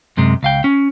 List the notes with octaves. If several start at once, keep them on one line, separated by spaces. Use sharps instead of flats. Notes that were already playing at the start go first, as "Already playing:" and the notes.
F#2 C3 G#3
C#2 F5 G5
C#4